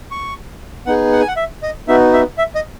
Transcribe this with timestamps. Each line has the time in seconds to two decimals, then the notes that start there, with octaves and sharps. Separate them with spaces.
0.11 C#6
0.86 B3 D#4 G#4 F#5
1.12 F#5
1.20 G#5
1.28 F#5
1.37 E5
1.63 D#5
1.88 B3 D#4 F#4 E5
2.13 E5
2.38 E5
2.55 D#5